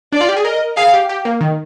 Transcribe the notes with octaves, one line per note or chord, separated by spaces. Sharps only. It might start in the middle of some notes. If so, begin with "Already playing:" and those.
D4 D5
F4
G4
G#4
A#4 D#5
G#4 F5
G4
G4
A#3
D#3